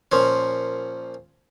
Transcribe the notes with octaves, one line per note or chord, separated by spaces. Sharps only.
A#2 F3 C#4